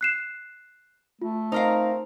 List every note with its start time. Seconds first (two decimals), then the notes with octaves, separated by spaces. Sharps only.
0.01 F#6 C7 E7
1.22 A3 F4
1.52 C4 D#4 A#4 F5